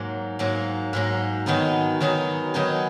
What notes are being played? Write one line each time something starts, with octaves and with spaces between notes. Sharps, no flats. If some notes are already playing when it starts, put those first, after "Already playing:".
Already playing: G#2 F#3 A#3
G#2 F#3 A#3
G#2 F#3 A#3
D#3 F#3 B3 D#4 G#4
D#3 F#3 B3 D#4 G#4
D#3 F#3 B3 D#4 G#4